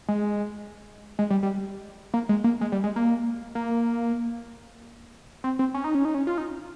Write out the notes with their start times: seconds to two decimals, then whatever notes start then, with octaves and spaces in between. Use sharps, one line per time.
0.09 G#3
1.19 G#3
1.30 G3
1.43 G3
2.14 A#3
2.29 G#3
2.44 A#3
2.61 G#3
2.72 G3
2.84 G#3
2.96 A#3
3.55 A#3
5.44 C4
5.59 C4
5.74 C#4
5.84 D#4
5.95 C#4
6.05 D#4
6.14 C#4
6.27 F4
6.38 D#4